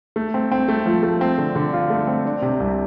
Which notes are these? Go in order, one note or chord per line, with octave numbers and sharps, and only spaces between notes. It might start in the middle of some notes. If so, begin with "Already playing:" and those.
A3
C4
C4
A3
F3
A3
C4
D3
D3
F4
A3
C4
D4
C3
C2